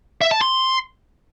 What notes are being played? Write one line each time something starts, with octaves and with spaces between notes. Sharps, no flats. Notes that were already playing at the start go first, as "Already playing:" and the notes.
E5
A5
C6